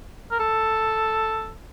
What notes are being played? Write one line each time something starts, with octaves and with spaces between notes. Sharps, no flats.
A#4
A4